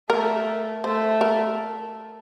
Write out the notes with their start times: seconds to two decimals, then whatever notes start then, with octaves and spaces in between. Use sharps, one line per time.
0.10 A3 A#4
0.84 A3 C5
1.21 A#4